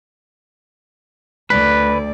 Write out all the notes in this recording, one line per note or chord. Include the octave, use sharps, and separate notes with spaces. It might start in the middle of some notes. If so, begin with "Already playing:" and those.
D2 B4 D5